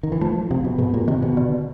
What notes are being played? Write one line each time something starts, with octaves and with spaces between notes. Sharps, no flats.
D#3
E3
F3 A3
C3 F3
B2
G#2 B2
A#2
C3 D#3
B2
D3